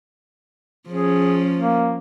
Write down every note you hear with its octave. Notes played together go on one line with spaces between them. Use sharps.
F3 C#4 G#4
A#3